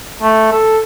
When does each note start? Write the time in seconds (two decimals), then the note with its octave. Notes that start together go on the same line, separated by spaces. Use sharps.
0.22 A3
0.52 A4